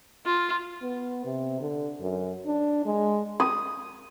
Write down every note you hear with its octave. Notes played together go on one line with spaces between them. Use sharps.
F4
B3
C3
D3
F#2
D4
G#3
D#6